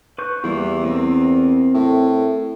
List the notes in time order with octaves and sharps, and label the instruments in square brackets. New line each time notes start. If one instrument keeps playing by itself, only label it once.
[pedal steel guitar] B4 C#6 G6
[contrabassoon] E2 [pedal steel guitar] G3 A#3 E4
[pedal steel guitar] C4 A#4
[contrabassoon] A2